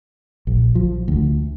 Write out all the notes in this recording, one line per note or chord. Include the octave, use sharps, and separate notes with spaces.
A#1
F3
D2